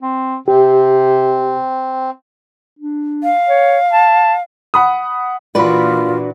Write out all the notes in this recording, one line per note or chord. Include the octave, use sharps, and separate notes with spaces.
C4
C3 C4 G4
D4
F5
C#5
A5
F#5 B5 D#6
A#2 E3 D4 F4 F#4 B4 D5 B5